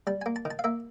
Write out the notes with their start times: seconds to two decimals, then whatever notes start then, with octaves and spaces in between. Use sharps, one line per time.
0.07 G3 A5
0.22 A#3 G#5
0.36 A5
0.45 D#3
0.51 A5
0.59 F5
0.64 A#3 E5